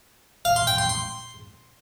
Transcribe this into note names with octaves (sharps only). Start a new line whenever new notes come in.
F5
C6
G5
C6
C6